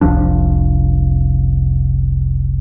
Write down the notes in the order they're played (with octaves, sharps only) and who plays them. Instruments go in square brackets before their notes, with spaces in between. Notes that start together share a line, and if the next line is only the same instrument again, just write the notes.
[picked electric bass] F1 C2 F3 D4